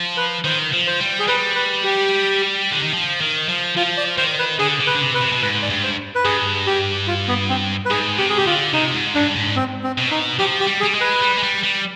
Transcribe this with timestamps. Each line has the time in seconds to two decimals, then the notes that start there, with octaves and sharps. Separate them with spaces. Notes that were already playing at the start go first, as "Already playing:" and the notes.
Already playing: F3
0.17 B4
0.44 D#3 C5
0.73 F3
0.87 C5
1.00 G3
1.19 G#4
1.28 G3 B4
1.55 B4
1.84 G4
2.71 D3
2.83 D#3
2.94 F3
3.21 D#3
3.49 F3
3.76 F3 F4
3.97 D5
4.18 D#3 C5
4.39 B4
4.59 D3 G#4
4.80 D3
4.87 B4
4.95 D3
5.01 C3
5.14 B4
5.21 C3
5.33 B2
5.42 G#2 B4
5.62 D5
5.70 G2
5.84 C5
6.15 B4
6.25 G2 G#4
6.67 G4
7.08 F4
7.28 B3
7.49 C4
7.85 B4
7.91 G#2 G#4
8.18 C3 G4
8.30 G#4
8.38 G4
8.46 D3 F4
8.73 C3 D#4
8.94 G#2
9.15 G2 D4
9.36 G#2
9.56 C4
9.84 C4
9.98 B2
10.11 D#4
10.39 F3 G4
10.60 G4
10.66 G3
10.80 G#4
10.84 G3
10.95 G#3
11.01 B4
11.22 G3
11.38 G#3
11.43 G3
11.63 G3